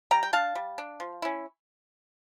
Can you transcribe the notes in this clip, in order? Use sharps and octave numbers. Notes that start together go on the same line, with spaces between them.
G3 G5 A#5
G5
D4 F5 A5
G3
D4
F3
C#4 E4